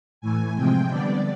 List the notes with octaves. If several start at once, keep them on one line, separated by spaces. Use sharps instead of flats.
A2 E3 A3 G#5
C3 F3 G#3 C4 G5
D3 G3 B3 D4 D5